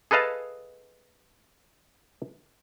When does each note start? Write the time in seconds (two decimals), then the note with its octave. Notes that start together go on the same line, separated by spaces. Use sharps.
0.11 G#4 A4 B4 D#5 F5 A5